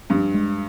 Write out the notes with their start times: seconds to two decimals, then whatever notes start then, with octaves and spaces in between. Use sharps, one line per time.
0.10 G2 F3
0.34 G#3